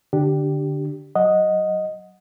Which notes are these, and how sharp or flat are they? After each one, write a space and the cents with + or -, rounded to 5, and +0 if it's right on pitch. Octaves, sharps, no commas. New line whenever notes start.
D3 +0 D4 +5 G4 -10
F#3 +0 D#5 +0 F#5 -15